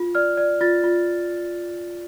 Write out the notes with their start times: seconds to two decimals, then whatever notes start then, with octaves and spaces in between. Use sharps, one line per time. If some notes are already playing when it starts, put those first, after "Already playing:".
Already playing: F4
0.15 D5 F6
0.37 D5
0.61 F4 A6
0.83 F4